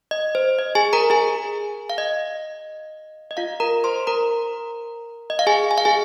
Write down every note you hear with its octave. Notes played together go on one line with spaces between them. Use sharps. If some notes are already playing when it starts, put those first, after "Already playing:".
D#5
C5
D#5
G#4 G#5
A#4 A#5
G#4 G#5
F5
D#5
D#5
F4 F5
A#4 A#5
C5 C6
A#4 A#5
D#5
F5
G#4 G#5
G#5
F5
G#4 G#5